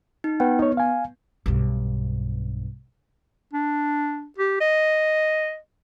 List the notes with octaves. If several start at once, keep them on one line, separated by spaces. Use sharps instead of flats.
D#4
B3 B4 F#5 G5
D#4 C#5
F5 G#5
B1 G2
D4
G4
D#5